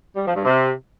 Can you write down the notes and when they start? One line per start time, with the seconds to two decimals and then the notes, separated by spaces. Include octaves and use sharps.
0.15 G3
0.25 F3
0.35 G2
0.45 C3